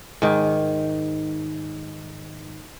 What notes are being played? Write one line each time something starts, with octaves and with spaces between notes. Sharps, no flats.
G#2 D#3